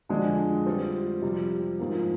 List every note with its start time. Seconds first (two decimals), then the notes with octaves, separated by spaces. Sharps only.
0.09 F2 D3 G#3 D4 G#4
0.66 G3 C4 F4
1.22 F2 C3 G3
1.79 G#2 F3 A#3